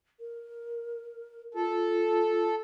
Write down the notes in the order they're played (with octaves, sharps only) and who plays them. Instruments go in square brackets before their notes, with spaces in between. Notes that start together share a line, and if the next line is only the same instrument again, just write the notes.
[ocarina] A#4
[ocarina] F4 [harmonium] A4